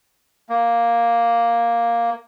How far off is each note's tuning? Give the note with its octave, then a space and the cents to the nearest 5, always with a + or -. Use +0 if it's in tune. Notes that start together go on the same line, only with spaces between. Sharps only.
A#3 +5